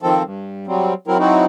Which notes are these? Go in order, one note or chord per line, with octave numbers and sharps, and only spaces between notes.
D#3 F3 C4 A4
G2
F#3 G3 C4
F#3 C4 E4 A#4
F#3 C4 D#4 E4 F#4